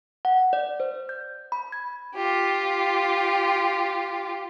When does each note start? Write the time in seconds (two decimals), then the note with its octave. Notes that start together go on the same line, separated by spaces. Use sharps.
0.25 F#5
0.53 D5
0.80 C5
1.09 G6
1.52 B5
1.72 G#6
2.15 F4 G4